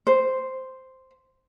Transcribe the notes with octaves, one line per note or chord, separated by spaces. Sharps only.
C5